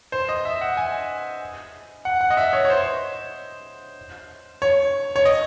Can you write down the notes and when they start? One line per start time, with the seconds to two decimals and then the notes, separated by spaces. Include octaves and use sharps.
0.12 C5
0.29 D#5
0.45 E5
0.61 F#5
0.77 G#5
2.05 F#5
2.21 F#5
2.30 D#5
2.37 E5
2.53 C#5
2.65 C#5
2.70 C5
4.62 C#5
5.16 C#5
5.25 D#5